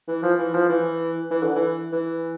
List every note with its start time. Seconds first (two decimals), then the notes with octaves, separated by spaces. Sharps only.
0.08 E3
0.22 F3
0.39 E3
0.54 F3
0.69 E3
1.31 E3
1.43 D3
1.56 E3
1.92 E3